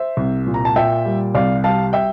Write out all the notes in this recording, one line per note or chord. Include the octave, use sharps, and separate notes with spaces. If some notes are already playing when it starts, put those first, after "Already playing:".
Already playing: C5 E5
C2
A#2
A#5
A5
A#2 E5 G5
G3
C2 D5 F5
G3 F5 A5
E5 G5